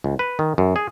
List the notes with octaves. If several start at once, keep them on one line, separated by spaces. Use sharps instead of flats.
C#2
B4
D#3
F#2
G#4